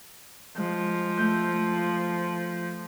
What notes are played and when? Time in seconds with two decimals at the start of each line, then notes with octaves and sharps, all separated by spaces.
0.57 F3 G#3
1.17 A3 G6